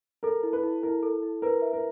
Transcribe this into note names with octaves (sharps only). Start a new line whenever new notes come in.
A4 A#4
E4
B4
E4
E4 A#4
A4
E4
A#4 B4
E5
A#4